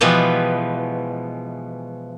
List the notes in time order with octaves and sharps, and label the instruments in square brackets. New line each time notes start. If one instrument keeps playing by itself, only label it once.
[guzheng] B2 E3 F3 G#3 B3 G4